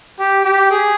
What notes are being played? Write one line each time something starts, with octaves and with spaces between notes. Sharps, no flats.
G4
G4
G#4